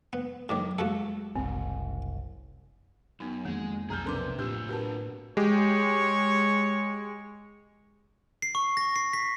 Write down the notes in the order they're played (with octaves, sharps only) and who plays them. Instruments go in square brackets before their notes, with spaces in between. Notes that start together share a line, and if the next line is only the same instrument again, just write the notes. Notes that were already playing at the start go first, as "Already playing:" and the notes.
[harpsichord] B3
[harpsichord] A2 D#3 [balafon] F#3 D6
[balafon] G#3 [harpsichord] A3 F#4 A4
[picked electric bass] F#1 C2 [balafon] C4
[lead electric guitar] F#2 [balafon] B3 D#4
[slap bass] F2 D#3 [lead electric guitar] G#3 [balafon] A#3
[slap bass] B1 F2 F#3 [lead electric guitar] G#4 A5 [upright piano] A#5 F6 G6
[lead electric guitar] C3 [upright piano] A#3 B3 D4 [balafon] A4 C6 D6
[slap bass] A2 C4 [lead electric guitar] D4 F4 [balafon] G4 [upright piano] E6 G6
[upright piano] F#4 B4 [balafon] G4 A#4 A5
[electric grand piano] G#3 G4 [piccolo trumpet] C#5
[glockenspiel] C7
C#6
A#6
C7
B6